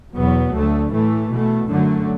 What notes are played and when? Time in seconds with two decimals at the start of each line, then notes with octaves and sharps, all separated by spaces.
0.14 E2 B2 F#3 B3
0.54 D2 D3 A3
0.92 A2 E3 A3
1.31 B2 A3
1.69 F#2 D3 F#3 A3